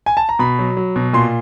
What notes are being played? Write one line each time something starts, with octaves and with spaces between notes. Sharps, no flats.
G#5
A5
A#5
B2 B5
F#3
F#3
B2
A#2 C6